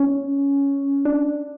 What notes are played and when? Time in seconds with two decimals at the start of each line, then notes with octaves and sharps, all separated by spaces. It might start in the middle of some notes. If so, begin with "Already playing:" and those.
Already playing: C#4
1.05 D4